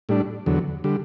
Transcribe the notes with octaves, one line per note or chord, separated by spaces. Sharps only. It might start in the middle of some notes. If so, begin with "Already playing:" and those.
A2 G3 D4
E2 D3 F#3
D3 G3